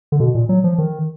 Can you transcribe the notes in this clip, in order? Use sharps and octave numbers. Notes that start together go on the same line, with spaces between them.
D3
B2
A#2
F#3
F3
D#3